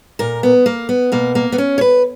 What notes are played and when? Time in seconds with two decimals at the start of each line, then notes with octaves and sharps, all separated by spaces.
0.19 A#2 A#4
0.43 B3
0.66 A#3
0.89 B3
1.12 B2 A#3
1.35 A#3
1.52 B3
1.58 C#4
1.78 C#5
1.81 B4